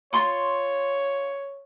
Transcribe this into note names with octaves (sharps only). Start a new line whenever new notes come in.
F4 C#5 C6 C#6